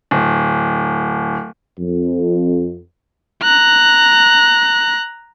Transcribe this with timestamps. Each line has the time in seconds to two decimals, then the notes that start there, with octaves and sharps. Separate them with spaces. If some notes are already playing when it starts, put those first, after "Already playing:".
0.11 D1
1.79 F2
3.43 A#5 F#6